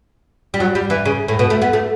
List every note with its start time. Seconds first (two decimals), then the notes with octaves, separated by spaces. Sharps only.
0.54 G3
0.60 F#3
0.75 G3
0.90 E3
1.05 C#3
1.28 A2
1.39 B2
1.50 A3
1.62 B3
1.73 A3